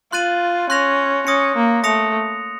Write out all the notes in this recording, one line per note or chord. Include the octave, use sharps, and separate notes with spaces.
F4 C6 F#6 A6 D#7 F#7
C#4 C6 F#6 A#6 F7
C#4 D#6 A#6 C#7
A#3
A3 D#6 A#6 C#7 F7